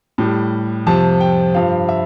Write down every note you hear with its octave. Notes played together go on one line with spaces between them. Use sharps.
A2 G3
F2 C3 F3 A5
G5
G2 F3 F5
E5